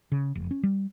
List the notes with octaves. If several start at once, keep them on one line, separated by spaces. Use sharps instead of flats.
C#3
F1
C#4
G3